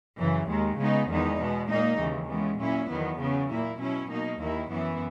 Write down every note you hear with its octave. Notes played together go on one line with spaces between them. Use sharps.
F#2 C#3 E3
D#2 D#3 G#3
C#3 G#3 B3 D#4
E2 D#3 G#3 B3 D#4
B2 G#3 B3
A#2 A#3 D#4
D#2 C#3 E3
C#3 E3 G#3 B3
A#2 F#3 C#4 E4
E2 D#3 F#3 B3
C#3 F#3 B3
A#2 A#3 E4
B2 F#3 C#4 E4
B2 A#3 D#4
D#2 D#3 A#3 E4
F#2 E3 B3 E4